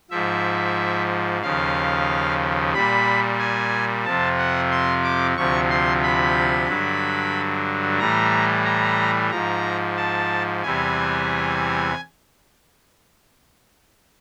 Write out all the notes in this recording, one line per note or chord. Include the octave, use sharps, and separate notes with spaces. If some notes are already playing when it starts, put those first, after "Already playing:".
G#2 F3 E5
D#2 C#3 F3 F5
A#2 G3 B5
G#5
F2 C3 F3 A5
F#5
C6
D6
D2 C3 F3 C#6
C6
B5
G2 D3 F#3
A2 E3 G3 A#5
A#5
G#2 F3 A#5
A5
E2 C3 E3 G3 G#5